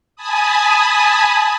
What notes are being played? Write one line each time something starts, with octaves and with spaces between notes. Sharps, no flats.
G#5 A5 B5 D#6